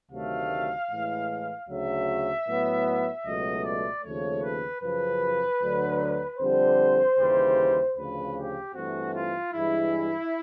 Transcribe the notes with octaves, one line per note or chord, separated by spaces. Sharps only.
D2 C3 D#3 F#3 A3 F5
A2 E3 G#3
D2 C#3 F#3 E5
A2 F#3 B3
C#2 B2 F#3 A3 D#5
D5
D#2 C#3 F3 A3 C#5
B4
F#2 C#3 F3 B4
D2 D3 F#3
F2 D3 G3 C5
D#2 C#3 E3 G3
D2 C#3 F3 B4
G4
G2 E3 A3 C4 F#4
F4
G2 E3 G#3 E4